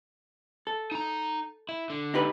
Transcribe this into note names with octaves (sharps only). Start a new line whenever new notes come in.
A4
D#4 A#5
E4
D3
D#4 G4 B4